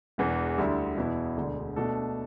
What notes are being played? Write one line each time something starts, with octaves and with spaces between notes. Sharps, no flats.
E1 E2 E3
D2 D3 G3 E4
E2 B2 B3 E4
E1 D2 D3
B2 A3 D4 A4